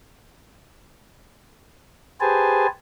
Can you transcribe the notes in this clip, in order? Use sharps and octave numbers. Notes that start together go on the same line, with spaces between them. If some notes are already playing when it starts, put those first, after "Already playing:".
G4 G#4 B4 C5 G#5 A5